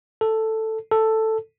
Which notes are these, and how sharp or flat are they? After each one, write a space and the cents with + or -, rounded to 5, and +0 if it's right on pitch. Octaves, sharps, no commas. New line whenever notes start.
A4 +5
A4 +5